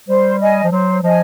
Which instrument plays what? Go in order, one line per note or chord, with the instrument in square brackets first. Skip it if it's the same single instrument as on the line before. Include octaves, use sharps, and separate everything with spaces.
[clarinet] G3 [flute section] C5
[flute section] D#5 G#5
[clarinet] F3
[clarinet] F#3 [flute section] C5
[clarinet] F3 [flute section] D#5 G#5